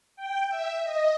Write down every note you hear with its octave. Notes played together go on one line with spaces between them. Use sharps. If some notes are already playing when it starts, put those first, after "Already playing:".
G5
E5
D#5